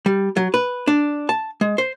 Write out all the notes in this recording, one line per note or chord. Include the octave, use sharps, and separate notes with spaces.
G3
F#3
B4
D4
A5
G#3
C5